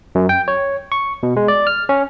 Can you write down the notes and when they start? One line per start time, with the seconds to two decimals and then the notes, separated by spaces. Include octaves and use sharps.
0.15 F#2
0.29 G5
0.48 C#5
0.92 C#6
1.23 B2
1.36 G#3
1.48 D5
1.67 F6
1.89 C#4